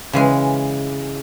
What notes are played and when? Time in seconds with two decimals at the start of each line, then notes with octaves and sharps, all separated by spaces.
0.13 C#3 E3 G#3